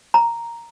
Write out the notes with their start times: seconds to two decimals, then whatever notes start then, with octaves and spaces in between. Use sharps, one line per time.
0.14 A#5